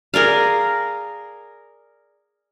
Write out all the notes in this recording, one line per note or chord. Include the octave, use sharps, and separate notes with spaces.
G#4 A#4 D5 F5